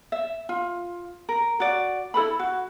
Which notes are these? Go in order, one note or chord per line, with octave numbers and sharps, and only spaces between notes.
E5
F4
A#4
F#4 D5
E4 A4 B4 B5
F#4